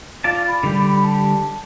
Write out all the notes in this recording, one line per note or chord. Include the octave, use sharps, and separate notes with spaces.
F4 D5 F5 A5
B5
D3 G3 G4
A5